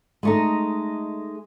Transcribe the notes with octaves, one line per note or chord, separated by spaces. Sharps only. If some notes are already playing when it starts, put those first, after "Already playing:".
G#3 A3 D#4